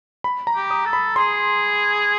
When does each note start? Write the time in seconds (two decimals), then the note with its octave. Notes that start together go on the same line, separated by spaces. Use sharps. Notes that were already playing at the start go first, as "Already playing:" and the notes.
0.24 B5
0.47 A#5
0.55 G4
0.71 D#6
0.85 A4
0.93 B5
1.16 G#4 C6